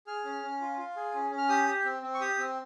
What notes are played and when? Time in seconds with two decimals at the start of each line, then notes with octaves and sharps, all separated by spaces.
0.07 G#4 F6
0.24 C#4
0.43 C#4
0.61 F4
0.78 F4
0.96 G#4
1.14 C#4
1.31 C#4
1.38 F6
1.49 G4 D#6
1.67 G4
1.85 C4
2.03 C4
2.14 C#6
2.20 G4 D#6
2.38 C4